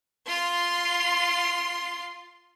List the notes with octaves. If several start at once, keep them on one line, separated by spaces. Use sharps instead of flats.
F4 C6